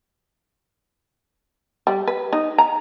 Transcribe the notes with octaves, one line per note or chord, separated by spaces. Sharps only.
G3
B4
D#4
A#5